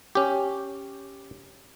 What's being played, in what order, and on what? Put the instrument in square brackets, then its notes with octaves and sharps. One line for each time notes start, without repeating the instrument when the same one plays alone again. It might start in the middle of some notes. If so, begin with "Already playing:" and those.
[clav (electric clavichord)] C#4 G4